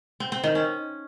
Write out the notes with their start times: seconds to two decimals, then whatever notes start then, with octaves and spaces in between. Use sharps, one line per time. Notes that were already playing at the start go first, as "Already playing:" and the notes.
0.20 C4
0.32 C4
0.44 D#3
0.55 C#4